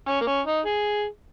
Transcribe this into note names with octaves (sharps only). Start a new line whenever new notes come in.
C#4
A#3
C#4
D#4
G#4